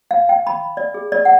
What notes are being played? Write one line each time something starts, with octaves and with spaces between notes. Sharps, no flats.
F5
G5
B5
D5
G#4
D5
F#5